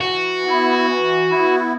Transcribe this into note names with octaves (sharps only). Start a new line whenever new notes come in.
E3 F#4
B3 E4
E3
B3 E4